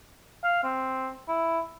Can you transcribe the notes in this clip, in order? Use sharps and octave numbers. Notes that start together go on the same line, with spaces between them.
F5
C4
E4